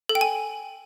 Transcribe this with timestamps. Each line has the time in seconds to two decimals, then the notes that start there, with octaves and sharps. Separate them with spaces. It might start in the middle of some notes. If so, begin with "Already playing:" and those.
0.09 A4
0.15 G5
0.21 G#5